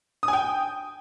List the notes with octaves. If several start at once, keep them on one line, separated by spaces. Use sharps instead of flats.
D#6
G#5
G5